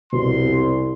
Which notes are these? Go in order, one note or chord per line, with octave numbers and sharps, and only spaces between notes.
C2 F2 B2 C6